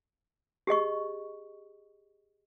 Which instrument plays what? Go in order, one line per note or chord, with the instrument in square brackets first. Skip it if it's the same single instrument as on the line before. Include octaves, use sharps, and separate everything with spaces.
[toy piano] G4 G#4 D#5 C#6